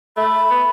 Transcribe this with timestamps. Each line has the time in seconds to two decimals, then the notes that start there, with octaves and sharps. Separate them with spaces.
0.17 A3 B5
0.50 B3